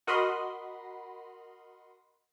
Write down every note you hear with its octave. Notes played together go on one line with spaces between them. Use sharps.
F#4 A#4 D#5 B5 C6